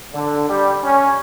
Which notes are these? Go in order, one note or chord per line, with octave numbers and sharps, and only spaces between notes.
D3
G3
C#4